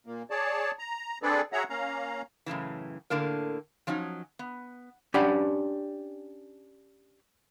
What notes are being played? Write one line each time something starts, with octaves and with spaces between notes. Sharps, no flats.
A#2 A#3
G#4 C#5 D5 A5
A#5
C4 D4 G#4 A4 B4 D5
F#4 G#4 C#5 E5 F#5 A#5
A#3 C#4 F5 A#5
F#2 A2 C#3 E3
A2 D3 A#3 A#4
F3 F#3 C#4 D#4
B3
C#4 D4 G4 F#5 B5